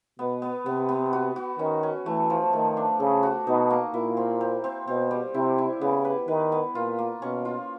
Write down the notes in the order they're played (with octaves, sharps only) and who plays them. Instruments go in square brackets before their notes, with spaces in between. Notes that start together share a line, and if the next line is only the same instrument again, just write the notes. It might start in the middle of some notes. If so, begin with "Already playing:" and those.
[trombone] B2 [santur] B3
[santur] B3
[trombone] C3 [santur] B3
[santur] B3
F#4
F#4
[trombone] D#3 [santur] C#4
[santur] C#4
[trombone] E3 [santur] A3
[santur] F3
[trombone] D#3 [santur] A3
[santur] D4
[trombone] C#3 [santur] A4
[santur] F#4
[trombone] B2 [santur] D#4
[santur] A#3
[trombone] A#2 [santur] E4
[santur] C4
C4
C4
[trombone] B2 [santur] C4
[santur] G3
[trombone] C3 [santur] E4
[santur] E4
[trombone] C#3 [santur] B3
[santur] B4
[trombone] D#3 [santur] B4
[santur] B3
[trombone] A#2 [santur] F4
[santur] A#3
[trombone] B2 [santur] C#4
[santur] F4